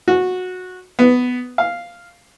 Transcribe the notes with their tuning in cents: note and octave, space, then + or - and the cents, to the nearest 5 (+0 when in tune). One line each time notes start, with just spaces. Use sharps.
F#4 -15
B3 +10
F5 -5